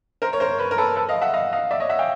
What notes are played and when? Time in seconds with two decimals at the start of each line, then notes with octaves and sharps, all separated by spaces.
0.22 A#4 C5
0.33 C#5
0.40 A#4 C5
0.58 B4 C#5
0.71 A#4
0.78 A4 B4
0.96 A4 B4
1.09 D#5 F5
1.21 E5 F#5
1.34 D#5 F5
1.52 D#5 F5
1.71 D5 E5
1.80 C#5 D#5
1.89 E5 F#5
1.99 F5 G5